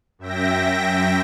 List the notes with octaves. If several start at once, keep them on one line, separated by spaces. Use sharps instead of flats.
F#2 E5 G5 A#6